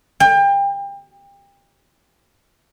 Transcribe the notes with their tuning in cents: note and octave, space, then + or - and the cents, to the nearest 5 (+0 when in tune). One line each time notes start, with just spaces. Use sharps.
G5 +30